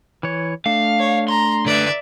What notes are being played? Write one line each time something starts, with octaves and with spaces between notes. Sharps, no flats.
E3 C#5
A3 D4 F5
C#5
A#5 C6
D3 B4 D5 E5